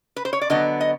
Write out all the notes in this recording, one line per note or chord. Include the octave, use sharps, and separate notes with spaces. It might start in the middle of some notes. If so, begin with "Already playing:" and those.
B4
C5
C#5
D5
D3 F#3 B3 D#5
D#5